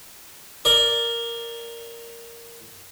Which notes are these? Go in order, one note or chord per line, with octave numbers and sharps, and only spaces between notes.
A#4 D5